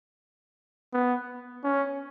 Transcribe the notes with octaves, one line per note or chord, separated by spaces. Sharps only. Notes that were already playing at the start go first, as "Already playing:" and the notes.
B3
C#4